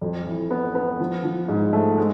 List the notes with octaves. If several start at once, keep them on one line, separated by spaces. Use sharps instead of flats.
F2
E3
B3
B3
F3
F3
G#2
A3
G#3